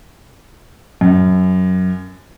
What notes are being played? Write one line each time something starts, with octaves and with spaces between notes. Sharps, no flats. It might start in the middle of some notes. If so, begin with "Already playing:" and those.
F#2